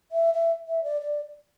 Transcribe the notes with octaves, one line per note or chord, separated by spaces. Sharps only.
E5
E5
E5
D5
D5